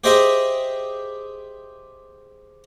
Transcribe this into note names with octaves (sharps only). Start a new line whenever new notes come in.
G4 G#4 C5 D#5 E5 G5